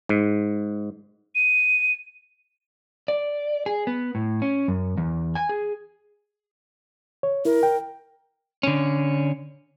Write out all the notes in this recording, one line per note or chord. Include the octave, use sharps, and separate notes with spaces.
G#2
D#7
D5
G#4
B3
A2
C#4
F#2
E2
G#5
G#4
C#5
E4 A#4
G5
D3 C#4